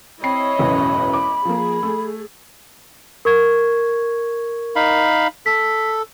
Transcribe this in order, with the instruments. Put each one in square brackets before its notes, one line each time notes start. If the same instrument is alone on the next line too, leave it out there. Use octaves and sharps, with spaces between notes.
[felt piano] C4 C7 [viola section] E4 C#5 D#5 [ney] B5
[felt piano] E1 A1 F#2
D6
[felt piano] F3 A#3 [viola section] G#4
[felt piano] A3
[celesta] A#4 C#6 G#6
[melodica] D#4 F5 B5
[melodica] A4 [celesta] B6